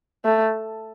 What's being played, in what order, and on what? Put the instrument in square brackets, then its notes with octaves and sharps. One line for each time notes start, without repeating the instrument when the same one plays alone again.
[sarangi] A3